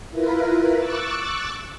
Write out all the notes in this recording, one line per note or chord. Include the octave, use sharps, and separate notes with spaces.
E4 F4 A#4 B4
C#6 D6 E6 F#6 A6